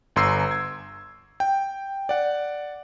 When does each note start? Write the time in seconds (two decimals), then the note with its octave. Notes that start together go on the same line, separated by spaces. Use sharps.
0.16 G1 A#5 C6 E6 C7
0.51 G#6
1.40 G5
2.09 D5 F#5